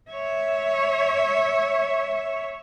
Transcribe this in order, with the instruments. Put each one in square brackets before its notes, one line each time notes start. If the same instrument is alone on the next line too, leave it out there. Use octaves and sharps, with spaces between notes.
[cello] C#5 E5